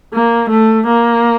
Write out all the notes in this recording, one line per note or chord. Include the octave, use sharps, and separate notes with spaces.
A#3
A3
A#3